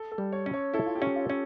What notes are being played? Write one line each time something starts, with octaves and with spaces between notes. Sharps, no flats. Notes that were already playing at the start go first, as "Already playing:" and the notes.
Already playing: A4
A4
G3
C#5
C#4
C#5
E4 A4
F4
G4
C#4
F4
C#4